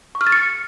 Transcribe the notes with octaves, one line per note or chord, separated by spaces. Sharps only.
C#6
F6
A6
C#7